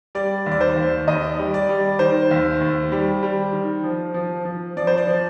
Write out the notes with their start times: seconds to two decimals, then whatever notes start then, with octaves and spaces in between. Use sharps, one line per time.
0.15 G3 D5
0.46 D#2
0.52 D5
0.61 C5
0.76 D#2
1.07 D#2 D#5
1.39 G3
1.54 D5
1.69 G3
1.99 D#3 C5
2.31 D#2
2.61 D#2
2.92 G3
3.23 G3
3.53 D#3
3.83 F3
4.14 F3
4.45 F3
4.77 F3 D5
4.87 C5
4.98 D5
5.07 F3